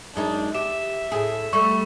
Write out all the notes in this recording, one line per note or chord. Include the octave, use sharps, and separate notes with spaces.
F#2 G#3 D4 D#4
G4 E5 E7
A2 G#4
G3 A3 C#6